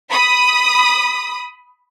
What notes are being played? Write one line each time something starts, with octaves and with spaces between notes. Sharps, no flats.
B5 D#6